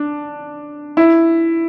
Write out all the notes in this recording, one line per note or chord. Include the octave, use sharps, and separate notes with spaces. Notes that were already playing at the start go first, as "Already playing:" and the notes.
Already playing: D4
E4